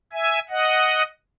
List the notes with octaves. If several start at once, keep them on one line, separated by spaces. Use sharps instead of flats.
E5 G#5
D#5 F#5